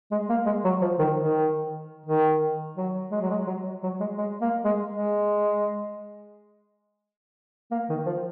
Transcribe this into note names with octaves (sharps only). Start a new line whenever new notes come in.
G#3
A#3
G#3
F#3
F3
D#3
D#3
D#3
F#3
G#3
F#3
G#3
F#3
F#3
G#3
G#3
A#3
G#3
G#3
A#3
D#3
F3